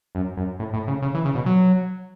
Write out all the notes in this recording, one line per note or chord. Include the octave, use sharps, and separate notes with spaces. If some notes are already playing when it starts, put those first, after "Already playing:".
F#2
F#2
A2
A2
C#3
C#3
E3
C#3
B2
F#3